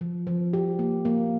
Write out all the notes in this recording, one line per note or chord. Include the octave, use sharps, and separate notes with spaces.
F3
F3
G4
A#3
A#3